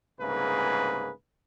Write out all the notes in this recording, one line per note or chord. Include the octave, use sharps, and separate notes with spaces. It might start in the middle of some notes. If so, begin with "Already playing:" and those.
C2 G#2 C#3 A#3 G#4 B4